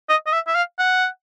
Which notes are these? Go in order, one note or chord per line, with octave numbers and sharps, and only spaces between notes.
D#5
D#5
E5
E5
F5
F#5